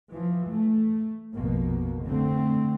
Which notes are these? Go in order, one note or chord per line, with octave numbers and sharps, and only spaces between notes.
E3 F3
A3
A#1 F2 B2 A#3
D3 A3 C4